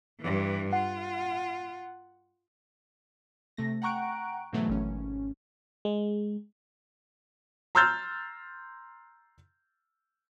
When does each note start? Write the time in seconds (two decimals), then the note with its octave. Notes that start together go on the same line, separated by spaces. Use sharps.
0.21 G2 E3
0.72 F4 F#5
3.57 C3 A3 A#6
3.82 F#5 G5 A#5 C#6 F#6 D7
4.53 G#2 B2 E3 F#3 A3
4.69 G#1 C#4
5.85 G#3
7.75 A#5 C6 E6 F6 G6 A6